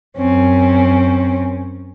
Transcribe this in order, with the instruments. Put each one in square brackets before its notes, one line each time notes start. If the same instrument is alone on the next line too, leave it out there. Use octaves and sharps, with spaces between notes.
[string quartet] F#2 C4 C#4